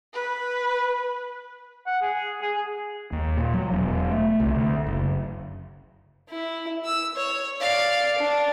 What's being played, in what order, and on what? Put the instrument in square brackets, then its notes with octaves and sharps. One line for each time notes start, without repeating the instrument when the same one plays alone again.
[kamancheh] B4
[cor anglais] F#5
G#4
G#4
[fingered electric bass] D#2
A#2
F#3
E1
A3
C2
D2
F#1
[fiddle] E4
E6
C#5
D5 F5
D4